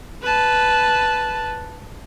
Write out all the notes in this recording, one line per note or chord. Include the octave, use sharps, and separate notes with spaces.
B4 A5